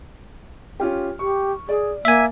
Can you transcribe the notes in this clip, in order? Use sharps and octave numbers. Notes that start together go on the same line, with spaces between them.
C#4 F4 G4
G4 C#6
G#4 D5
A#3 E5 G#5